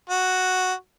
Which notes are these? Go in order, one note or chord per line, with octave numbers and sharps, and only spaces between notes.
F#4